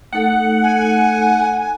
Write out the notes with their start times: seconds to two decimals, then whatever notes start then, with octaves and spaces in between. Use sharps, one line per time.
0.13 A3 D#4 A4 F#5
0.63 G#5